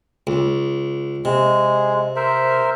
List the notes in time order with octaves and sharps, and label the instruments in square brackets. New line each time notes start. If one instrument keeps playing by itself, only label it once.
[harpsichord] C#2
[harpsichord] C3 [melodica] G#3
[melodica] A#4 C5 E5